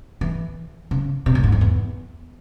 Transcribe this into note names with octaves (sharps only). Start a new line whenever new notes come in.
E3
C#3
C3
A#2
G#2
F2
E2